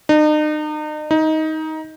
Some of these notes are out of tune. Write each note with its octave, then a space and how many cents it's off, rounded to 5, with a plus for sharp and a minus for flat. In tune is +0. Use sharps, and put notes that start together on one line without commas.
D#4 -40
D#4 +15